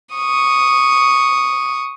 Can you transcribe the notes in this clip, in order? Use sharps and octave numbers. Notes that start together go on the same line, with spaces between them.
C#6 D#6